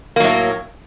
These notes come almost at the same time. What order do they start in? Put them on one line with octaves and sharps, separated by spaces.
A#3 F#3 A2